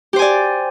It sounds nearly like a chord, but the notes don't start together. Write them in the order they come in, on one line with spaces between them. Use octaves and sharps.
G4 C5 G#5 D5